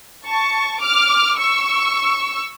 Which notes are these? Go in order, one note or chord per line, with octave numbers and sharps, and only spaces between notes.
A5 C#6
D6 F6
C#6 E6